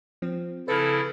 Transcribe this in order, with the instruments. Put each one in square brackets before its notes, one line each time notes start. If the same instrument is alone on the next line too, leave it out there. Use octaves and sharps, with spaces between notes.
[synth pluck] F3 C4
[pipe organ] C#3 E4 [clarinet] A4 [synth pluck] B4 F6